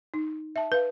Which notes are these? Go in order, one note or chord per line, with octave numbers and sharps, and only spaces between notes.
D#4
E5 A5
B4 F5